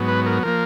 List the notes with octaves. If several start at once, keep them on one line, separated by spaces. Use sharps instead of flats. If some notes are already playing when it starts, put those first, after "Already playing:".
Already playing: G#2 F#3 B3
B4
A#4
F3 A#3 A#4